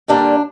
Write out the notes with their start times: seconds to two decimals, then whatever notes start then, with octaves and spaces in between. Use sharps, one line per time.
0.08 G2 D3 G3 A#3 D4